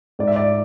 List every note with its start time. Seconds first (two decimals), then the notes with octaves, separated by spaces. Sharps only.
0.19 G#2 D5
0.27 E5
0.36 D5